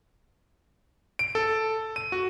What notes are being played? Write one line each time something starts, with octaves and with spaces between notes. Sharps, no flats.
D7
A4
D#7
F#4